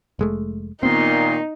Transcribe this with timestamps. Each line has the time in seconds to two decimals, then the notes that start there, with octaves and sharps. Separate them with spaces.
0.19 F1 G#3 A3
0.83 A#2 D#3 B3 C4 D#4 C6